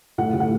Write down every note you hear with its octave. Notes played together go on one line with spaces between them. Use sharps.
A2 F#5
A2
F#5